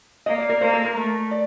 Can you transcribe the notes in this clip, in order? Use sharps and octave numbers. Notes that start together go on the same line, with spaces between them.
A#3 D#5
D5
A#4
A#3 C5
A4
A#4
A3
D5